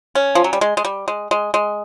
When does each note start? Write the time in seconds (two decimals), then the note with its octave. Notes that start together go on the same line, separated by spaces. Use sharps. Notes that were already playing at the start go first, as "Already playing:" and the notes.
0.15 C#4
0.35 F3
0.44 F#3
0.53 G3
0.61 G#3
0.77 G#3
0.85 G3
1.08 G#3
1.31 G#3
1.54 G#3